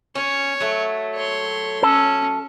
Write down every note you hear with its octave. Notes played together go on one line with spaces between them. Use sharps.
C#4 C#5
F#3 A3
C#5 C6
C#4 A4